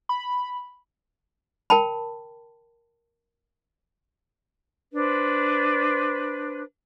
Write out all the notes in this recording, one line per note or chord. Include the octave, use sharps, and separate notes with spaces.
B5
A#4 G5 A5 B5
D4 B4 C5